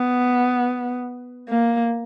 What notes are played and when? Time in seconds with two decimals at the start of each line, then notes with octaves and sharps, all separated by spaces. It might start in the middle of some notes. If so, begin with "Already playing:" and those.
Already playing: B3
1.49 A#3